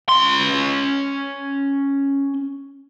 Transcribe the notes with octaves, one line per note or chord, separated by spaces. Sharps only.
C#4 C6